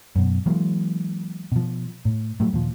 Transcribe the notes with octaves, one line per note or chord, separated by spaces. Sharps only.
F#2 B2
E3 F#3 G#3 A#3
B2 F3
A2
A2 F#3 G3 A3
D#2 A#2 F3